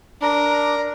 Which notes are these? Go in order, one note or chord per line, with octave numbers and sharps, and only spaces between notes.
D4 A#4